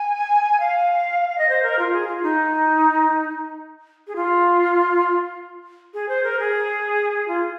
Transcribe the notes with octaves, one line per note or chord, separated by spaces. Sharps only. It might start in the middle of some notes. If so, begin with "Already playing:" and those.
Already playing: G#5
F5
D#5
C5
A#4
F4
G#4
F4
D#4
G#4
F4
G#4
C5
A#4
G#4
F4